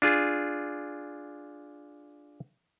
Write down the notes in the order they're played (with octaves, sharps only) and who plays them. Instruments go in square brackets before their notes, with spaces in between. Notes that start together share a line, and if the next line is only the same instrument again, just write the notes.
[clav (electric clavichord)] D4 F4 G#4